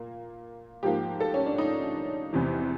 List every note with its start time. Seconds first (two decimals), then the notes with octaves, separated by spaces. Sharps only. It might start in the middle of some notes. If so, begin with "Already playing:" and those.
Already playing: A#2 A#3
0.83 G#2 F3 A#3 G4
1.20 A4
1.34 C#4
1.46 D4
1.58 D#4
2.33 E2 C3 E3